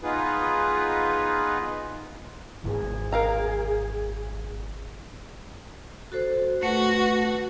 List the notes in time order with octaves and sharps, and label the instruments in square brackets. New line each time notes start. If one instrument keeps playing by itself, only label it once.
[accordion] B3 D#4 F4 G#4 B4
[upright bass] G#1 E2 [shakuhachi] G#4
[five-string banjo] A#4 F5 A#5
[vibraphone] F#4 A4 C5
[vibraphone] A3 B4 [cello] F#4